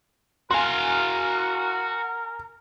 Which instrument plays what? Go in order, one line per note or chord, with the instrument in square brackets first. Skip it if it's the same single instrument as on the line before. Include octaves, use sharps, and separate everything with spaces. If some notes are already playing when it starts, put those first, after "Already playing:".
[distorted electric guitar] F#4 F5 [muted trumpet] A#4 [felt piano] G#5 C6